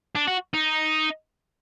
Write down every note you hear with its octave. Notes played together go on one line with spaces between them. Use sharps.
D4
F#4
D#4